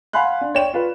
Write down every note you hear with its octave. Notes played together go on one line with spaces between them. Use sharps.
F5 F#5 G#5 B5 C6 F#6
D4
C#5 D5 G5 E7
F4 B4